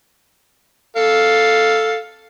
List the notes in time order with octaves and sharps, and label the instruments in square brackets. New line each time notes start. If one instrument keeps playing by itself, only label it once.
[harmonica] A4 F5